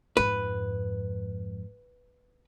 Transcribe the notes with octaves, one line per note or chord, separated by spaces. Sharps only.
F2 G#2 B4